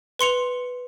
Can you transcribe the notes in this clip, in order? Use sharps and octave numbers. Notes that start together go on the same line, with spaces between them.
B4 C6 C#7 F7